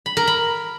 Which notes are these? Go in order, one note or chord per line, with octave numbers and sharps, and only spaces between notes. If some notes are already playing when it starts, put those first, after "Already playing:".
B5
A#4
B5